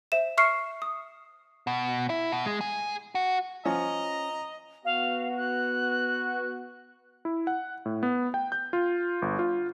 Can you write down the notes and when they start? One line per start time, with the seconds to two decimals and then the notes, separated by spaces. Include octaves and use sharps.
0.12 C5 E5 E7
0.37 E5 C#6 F6 C7 C#7
0.82 D#6
1.67 B2
2.10 E4
2.32 B2
2.46 G#3
2.61 G#4
3.15 F#4
3.65 F3 C#4 D#5 A#5
4.85 B3 F#4 F5
5.37 F#6
7.25 E4
7.47 F#5
7.86 A2
8.03 B3
8.34 G5
8.52 G6
8.73 F4
9.22 G1
9.39 F4